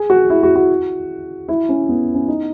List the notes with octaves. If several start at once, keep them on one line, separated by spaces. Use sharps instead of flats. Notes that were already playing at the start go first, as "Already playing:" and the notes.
Already playing: G#4
F#4
E4
F#4
F#4
E4
C#4
B3
C#4
D#4